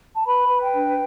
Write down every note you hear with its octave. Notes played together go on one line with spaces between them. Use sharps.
A5
B4 B5
B4
G5
D4